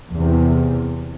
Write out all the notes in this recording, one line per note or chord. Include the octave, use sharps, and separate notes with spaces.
E2 C3